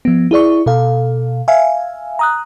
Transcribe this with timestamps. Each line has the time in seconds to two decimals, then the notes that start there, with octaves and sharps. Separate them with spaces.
0.05 F3 B3
0.31 E4 G#4 D5 C#6
0.66 B2 A4 F5
1.48 E5 F5 G#5
2.19 A#5 D#6 F#6